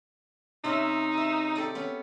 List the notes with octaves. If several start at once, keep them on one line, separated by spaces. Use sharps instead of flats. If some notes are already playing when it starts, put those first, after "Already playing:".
C3 C#4 D#4 E5
G#4 E5
G4 A4 D5
B3 C#4